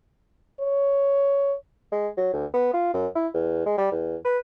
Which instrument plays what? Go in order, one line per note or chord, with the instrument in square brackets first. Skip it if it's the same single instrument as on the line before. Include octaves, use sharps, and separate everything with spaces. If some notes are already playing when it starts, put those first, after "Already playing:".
[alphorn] C#5
[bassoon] G#3
F#3
D2
B3
F4
F#2
E4
E2
G#3
G3
E2
B4